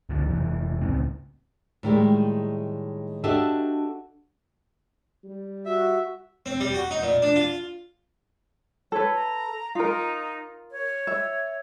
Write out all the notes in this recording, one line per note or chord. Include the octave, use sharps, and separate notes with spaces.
C#2 D3 E3 F3
F1 E3
C#2 A2 C#3 C4
A2 D#3 G3 G#3
D4 F#4 G4 A4 D#5 E5
G3
F#4 E5
C4
G3
F#4
D#4
A#2
D4
F4
A4 B4 C#5
A#5
D#4 F4 A#4
C#5
E5